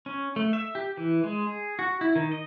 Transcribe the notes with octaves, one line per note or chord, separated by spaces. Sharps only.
C#4
A3
E5
G4
E3
G#3
G#4
F#4
E4
D#3
D#5